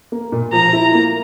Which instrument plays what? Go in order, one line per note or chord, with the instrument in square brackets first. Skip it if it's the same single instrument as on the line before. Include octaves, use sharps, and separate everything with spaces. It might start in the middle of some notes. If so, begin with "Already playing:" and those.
[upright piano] A#3
A#2
[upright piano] F3 [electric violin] A#5
[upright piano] E4
A#3